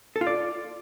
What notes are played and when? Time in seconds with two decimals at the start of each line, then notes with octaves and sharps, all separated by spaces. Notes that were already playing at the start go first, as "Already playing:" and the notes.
0.16 A4
0.21 F4
0.27 D5